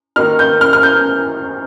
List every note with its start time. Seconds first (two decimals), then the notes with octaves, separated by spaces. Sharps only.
0.16 D#3 A#3 D#4 F6
0.39 G6
0.61 F6
0.73 F6
0.83 G6